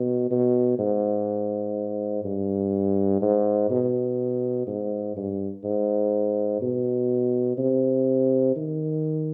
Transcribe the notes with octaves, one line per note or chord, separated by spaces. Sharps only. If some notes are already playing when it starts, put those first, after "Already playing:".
Already playing: B2
B2
G#2
G2
G#2
B2
G#2
G2
G#2
B2
C3
D#3